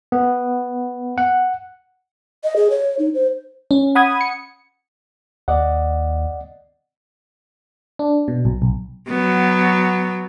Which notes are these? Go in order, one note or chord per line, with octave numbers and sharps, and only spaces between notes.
B3
F#5
D#5
G#4
C#5
D#4
C5
C#4
F#5 B5 D#6 G#6
C#7
D#2 D5 D#5 F#5
D4
B2
B1
B1
F#3 B3